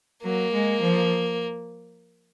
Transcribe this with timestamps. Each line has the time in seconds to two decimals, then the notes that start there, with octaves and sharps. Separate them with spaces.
0.23 F#3 A#3
0.52 G#3
0.81 F3